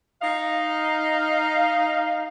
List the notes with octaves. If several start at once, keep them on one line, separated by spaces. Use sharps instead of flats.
D#4 D#5 F5